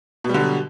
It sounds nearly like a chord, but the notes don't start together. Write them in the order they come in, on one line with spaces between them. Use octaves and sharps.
B2 G3 D3 F#3